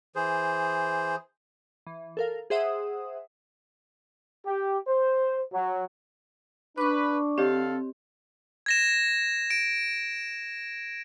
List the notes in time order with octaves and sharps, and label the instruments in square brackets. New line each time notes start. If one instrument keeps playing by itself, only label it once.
[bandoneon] E3 G#4 C5
[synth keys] E3
A4 A#4 F5
G#4 C5 E5 F#5 D#6
[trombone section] G4
C5
F#3
[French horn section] D4 [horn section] B4 [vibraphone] C#6 D6
[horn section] D3 A4 F5 [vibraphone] C4 [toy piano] G4 C#5 D#5
[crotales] G#6 A#6 E7
D7